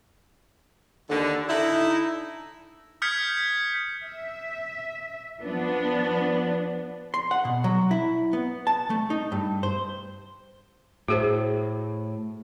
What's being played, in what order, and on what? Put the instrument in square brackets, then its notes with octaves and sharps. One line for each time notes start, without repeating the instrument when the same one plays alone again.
[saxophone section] D#2 D3
D3 D#4 E4
[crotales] D#6 F6 G6 G#6 B6 C#7
[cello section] E5
F3 B3 D4
[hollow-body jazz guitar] C6
F#5
B2
F#3
E4
B3
A5
A3
D#4
G2
C5
[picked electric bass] A2 [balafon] F#4 G#4 C5